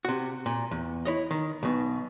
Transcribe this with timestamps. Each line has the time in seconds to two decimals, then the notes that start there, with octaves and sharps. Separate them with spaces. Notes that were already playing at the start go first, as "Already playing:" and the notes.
0.05 C3 F#4
0.46 A#2
0.71 E2
1.05 E4 C#5 D#5
1.31 D#3
1.63 B1 B2